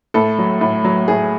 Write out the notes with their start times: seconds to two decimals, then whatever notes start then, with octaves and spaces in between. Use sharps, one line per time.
0.14 A2 A4
0.39 F#3
0.61 A2
0.84 F#3
1.08 A2 G#4